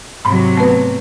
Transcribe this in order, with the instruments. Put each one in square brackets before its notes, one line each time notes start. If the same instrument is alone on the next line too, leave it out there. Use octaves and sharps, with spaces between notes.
[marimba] G#2 B5 [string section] C3 F#3
[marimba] A3 B3 B4